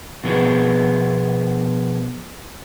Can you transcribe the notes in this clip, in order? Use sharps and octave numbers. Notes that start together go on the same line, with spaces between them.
B2 F3 B3 G#4